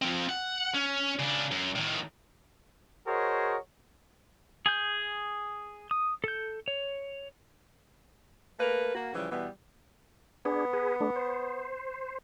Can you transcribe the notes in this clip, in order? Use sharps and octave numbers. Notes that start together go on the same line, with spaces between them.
F3 C4
F#5
C#4
C#3 D4
F#2
A2 D#3
F#4 G#4 A#4 C5 C#5 D#5
G#4 G#5 G6
D#6
A4 G6
C#5
A3 A#3 A#4 B4
A#3 F#4
C#3 E3 F3 G3
B2 E3 G3 B3
B3 D4 G#4
G#4 B4
A3 D4
C5